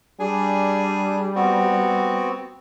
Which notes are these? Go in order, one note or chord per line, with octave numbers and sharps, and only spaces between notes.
G3 D4 G#4 G#5
B3 C4 F#4